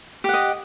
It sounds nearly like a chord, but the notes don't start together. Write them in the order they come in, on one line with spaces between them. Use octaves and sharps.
G4 F#5 D#5